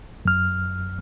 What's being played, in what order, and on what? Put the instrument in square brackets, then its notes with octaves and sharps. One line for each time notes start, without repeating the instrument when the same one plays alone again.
[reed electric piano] F#2 F6